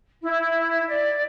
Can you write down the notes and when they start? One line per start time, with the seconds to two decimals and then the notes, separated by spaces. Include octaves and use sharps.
0.22 E4
0.86 D5